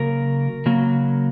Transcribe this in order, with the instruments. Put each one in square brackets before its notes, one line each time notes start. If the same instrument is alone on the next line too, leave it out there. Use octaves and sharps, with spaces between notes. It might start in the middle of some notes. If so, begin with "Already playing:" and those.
Already playing: [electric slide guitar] C#3 F#3 A#3 A#4
C#3 F#3 A#3